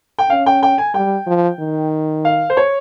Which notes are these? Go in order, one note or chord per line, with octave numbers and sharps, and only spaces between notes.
G5
C#4 F5
G5
G5
G#5
G3 G5
F3
D#3
F5
C5
C#5